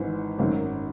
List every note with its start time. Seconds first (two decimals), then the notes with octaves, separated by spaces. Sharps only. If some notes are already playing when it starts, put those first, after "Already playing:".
Already playing: G#1 G#2 E3
0.38 G#1 F#2 D#3 F#3